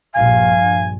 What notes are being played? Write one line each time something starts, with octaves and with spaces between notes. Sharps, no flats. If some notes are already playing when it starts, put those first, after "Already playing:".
A#1 G2 F5 G#5